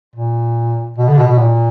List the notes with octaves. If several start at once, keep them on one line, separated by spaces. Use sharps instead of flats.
A#2
B2
D3
B2
B2
A#2